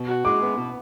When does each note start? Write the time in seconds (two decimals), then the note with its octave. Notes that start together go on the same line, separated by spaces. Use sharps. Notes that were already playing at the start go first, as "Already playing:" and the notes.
Already playing: B2
0.08 F#4
0.25 G#3 D6
0.41 B3
0.58 B2